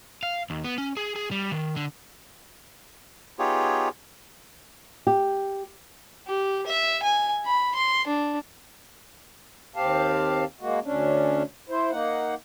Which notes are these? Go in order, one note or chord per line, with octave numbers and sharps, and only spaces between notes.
F5
D#2
B3
C#4
G#4
G#4
G3
D#3
D3
B3 D#4 F4 G4 G#4 C#5
G4
G4
E5
G#5
B5
C6
D4
D#2 C4 G4 F5 A5
G#3 A#3 F#4
D2 C#4 D4
E4 C5
A#3 D#4 F#5